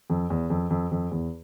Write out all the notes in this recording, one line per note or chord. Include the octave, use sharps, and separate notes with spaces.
F2
E2
F2
F2
F2
E2